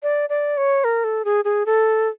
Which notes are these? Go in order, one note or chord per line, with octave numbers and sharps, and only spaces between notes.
D5
D5
C#5
A#4
A4
G#4
G#4
A4